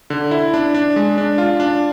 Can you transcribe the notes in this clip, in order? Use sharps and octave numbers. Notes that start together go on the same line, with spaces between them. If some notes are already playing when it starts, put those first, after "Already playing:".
D3
E4
D4
D4
G#3
D4
F4
D4